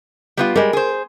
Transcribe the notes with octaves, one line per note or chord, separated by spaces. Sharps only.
G3 B3 F4
G3 G#3 A#4
G#4 C5